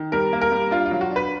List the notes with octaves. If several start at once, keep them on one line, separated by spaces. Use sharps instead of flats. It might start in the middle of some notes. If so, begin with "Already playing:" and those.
Already playing: D#3
G3 A#4
A#3
A#4
G3
D4 F4
F4
F#3
F#4
D4
B4